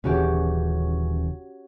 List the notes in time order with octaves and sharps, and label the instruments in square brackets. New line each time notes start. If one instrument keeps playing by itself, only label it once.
[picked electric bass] D#1 C#3 E3 [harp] C#4 F#4 G4